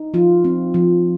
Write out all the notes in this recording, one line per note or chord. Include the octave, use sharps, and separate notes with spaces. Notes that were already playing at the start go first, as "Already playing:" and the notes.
Already playing: D#4
F3 F4
C4
F3